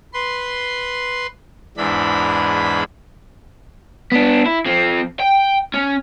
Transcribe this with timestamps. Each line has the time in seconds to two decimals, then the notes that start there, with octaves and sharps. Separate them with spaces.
0.14 B4 C6
1.77 E2 G#2 E3 D4 B5
4.12 B3 D4
4.46 E4
4.65 F3 C4
5.20 G5
5.74 C#4